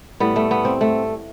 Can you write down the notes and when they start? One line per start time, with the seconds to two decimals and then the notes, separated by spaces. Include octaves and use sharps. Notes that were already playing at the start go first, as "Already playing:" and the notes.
0.20 A2 G3 B3
0.36 A3
0.51 B3
0.65 C4
0.81 A3